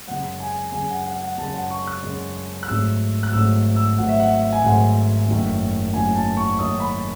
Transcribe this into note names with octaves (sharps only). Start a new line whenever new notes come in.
F#2 C#3 G#3 F#5
G#5
F#2 C#3 G#3 G#5
F#5
F#5
F#5
F#2 C#3 G#3 A5
F#5
C#6
F#6
F#2 C#3 G#3
F#6
G#1 G#2 F#3 A3 E6
F#6
G#1 G#2 F#3 A3 E6
E6
G#1 G#2 F#3 A3 F#5
E5
F#5
G#5
G#1 G#2 F#3 A3 F#5
F#1 F#2 D#3 F#3 A3
F#1 F#2 D#3 F#3 A3 G#5
A5
C#6
F#1 F#2 D#3 F#3 A3 D#6
B5